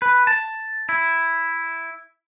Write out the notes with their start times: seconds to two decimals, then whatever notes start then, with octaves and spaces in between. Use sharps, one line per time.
0.02 B4
0.27 A5
0.89 E4